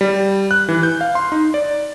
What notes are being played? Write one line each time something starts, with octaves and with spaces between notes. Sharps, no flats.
G3
F#6
E3
G6
F5
C6
D#4
D5